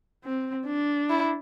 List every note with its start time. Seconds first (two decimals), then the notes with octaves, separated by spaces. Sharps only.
0.24 C4
0.67 D4
1.10 E4